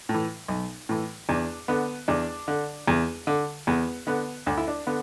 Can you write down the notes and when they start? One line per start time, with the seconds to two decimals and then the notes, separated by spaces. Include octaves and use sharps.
0.09 A2
0.14 E3
0.48 B1
0.89 A2 E3
1.29 E2 D4
1.68 D3 B3
2.08 E2 D4
2.48 D3
2.88 E2
3.27 D3
3.67 E2 B3
4.07 D3 B3
4.46 D2 D4
4.58 E4
4.68 D4
4.87 D3 B3